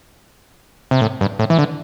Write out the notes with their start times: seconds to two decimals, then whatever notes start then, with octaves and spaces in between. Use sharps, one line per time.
0.91 C3
1.01 A2
1.21 G2
1.39 A2
1.50 E3
1.59 D3